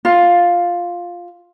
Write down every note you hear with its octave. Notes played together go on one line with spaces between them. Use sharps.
F4